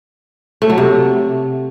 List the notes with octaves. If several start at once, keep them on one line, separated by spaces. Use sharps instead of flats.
A3
F#3
C3